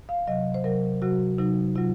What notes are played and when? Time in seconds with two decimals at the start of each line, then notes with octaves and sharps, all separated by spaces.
0.09 F5
0.27 C3 F#3 D#5
0.54 C5
0.64 C3 F#3 A#4
1.02 C3 F#3 F#4
1.38 C3 F#3 D#4
1.76 C3 F#3 F4